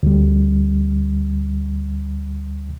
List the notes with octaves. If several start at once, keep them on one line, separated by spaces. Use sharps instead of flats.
D2 G3